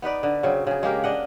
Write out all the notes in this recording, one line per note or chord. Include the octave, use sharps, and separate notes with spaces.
B3 D#4 B4 D5
D3
C#3 F#3 C4
C#3 G#4
G#3 A#3 G4 A#4
D4 D#5 F#5